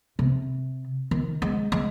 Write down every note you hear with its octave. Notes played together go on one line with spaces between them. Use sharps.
C3
D#3
G#3
G#3